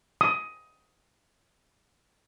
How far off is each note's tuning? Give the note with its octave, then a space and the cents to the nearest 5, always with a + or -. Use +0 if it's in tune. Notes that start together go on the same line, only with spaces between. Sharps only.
D#6 +15